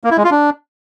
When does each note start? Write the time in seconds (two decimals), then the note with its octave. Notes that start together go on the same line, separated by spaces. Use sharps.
0.04 A#3
0.11 E4
0.17 G#3
0.24 F4
0.31 D4